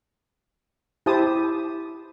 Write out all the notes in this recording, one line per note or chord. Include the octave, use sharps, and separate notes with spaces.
E4 G4 C5 A5 D#6